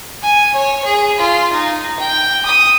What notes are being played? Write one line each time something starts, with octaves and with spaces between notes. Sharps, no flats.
G#5
C#5
G#4
F4
D#4
G5
D#6